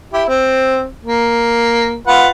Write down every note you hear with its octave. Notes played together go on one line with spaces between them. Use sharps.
E4 G4
C4
A#3
F4 B4 F#5